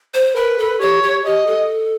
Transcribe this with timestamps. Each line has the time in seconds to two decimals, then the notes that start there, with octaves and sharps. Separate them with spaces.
0.14 C5
0.36 A#4 B4
0.58 A4
0.81 G4 C#5
1.03 G4
1.24 G4 D#5
1.47 A4